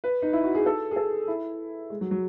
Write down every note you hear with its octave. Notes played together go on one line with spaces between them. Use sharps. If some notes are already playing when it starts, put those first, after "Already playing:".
B4
D#4
E4
F#4
G#4
A4
G#4
A4
E4
G#3
F#3
F#3